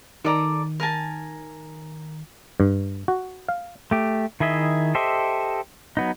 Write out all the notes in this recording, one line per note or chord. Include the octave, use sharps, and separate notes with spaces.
D#3 A4 D5 A#5
A#4 G#5 A5
G2
F#4
F5
A3 G4
D#3 E4 G#4 D#5 E5
G4 A4 C5 D#5 E5
F#3 B3 D#4